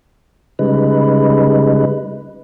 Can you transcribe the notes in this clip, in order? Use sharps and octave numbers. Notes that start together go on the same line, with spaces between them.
C#3 G3 G#3 D#4 B4